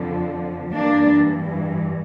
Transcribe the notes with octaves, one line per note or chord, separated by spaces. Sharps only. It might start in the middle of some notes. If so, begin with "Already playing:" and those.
Already playing: F2 D3 F3
G2 E3 A#3 D4